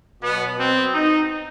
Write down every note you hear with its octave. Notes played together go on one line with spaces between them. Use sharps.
B2 F#3 B3
C4
D#4